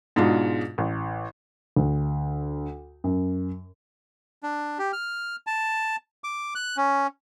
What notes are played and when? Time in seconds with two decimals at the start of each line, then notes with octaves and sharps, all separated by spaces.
0.16 G#2 B2 G#3 D4 F4 F#4
0.78 A1
1.76 D2
3.04 F#2
4.43 D4
4.79 G4
4.93 F6
5.47 A5
6.24 D6
6.55 F#6
6.77 C#4